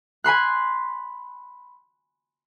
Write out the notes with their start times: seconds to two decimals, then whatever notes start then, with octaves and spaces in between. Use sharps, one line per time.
0.24 G#5 B5 C6 F#6